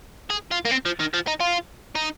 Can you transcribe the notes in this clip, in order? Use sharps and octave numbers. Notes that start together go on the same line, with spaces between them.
G#4
F4
A#3
C4
F3
D#3
F3
D#4
F4
D#4